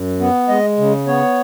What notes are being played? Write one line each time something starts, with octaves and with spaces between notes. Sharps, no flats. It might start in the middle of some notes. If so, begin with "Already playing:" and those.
Already playing: F#2
B3
G#3 D#5
C#3
B3 C#5